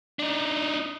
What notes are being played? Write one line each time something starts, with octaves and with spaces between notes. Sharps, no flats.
D4 D#4